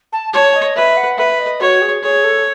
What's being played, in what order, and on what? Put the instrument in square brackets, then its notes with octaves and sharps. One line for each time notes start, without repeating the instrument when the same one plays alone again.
[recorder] A5
[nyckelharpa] C#5 [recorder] A5
[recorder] D#5
[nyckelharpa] B4 [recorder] E5
[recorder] F#5
[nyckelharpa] B4 [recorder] E5
[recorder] D#5
[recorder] F#4 [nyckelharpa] C#5
[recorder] G#4
[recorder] G#4 [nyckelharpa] C#5
[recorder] A4